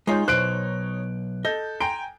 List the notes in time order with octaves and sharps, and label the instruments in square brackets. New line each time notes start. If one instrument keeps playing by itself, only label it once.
[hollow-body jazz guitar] G#3 F4 [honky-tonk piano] D#4 C#5 G6
[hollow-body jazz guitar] B1 G#2 C5 [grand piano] F#6 D7
[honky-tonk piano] A4 G6 [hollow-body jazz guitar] D#5
[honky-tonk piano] G5 G#5 A#5 [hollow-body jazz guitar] C6 [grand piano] D7